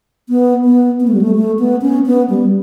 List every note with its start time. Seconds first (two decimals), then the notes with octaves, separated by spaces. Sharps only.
0.29 B3
0.65 B3
1.00 B3
1.07 A3
1.14 G3
1.21 A3
1.35 A3
1.59 B3
1.82 C#4
2.06 B3
2.30 G3